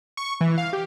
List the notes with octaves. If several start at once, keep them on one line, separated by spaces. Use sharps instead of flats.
C#6
E3
F5
G4